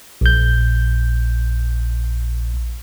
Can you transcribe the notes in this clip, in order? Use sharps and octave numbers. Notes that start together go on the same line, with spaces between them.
A#1 G6